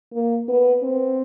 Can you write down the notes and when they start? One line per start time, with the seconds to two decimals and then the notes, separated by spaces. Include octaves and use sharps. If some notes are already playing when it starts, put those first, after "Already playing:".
0.14 A#3
0.48 B3
0.83 C4